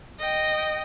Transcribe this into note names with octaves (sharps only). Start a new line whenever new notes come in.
D#5 G5